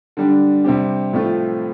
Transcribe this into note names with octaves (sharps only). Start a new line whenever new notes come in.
D3 G3 D4
C3 G3 C4 G4
A2 F3 A3 C4 F4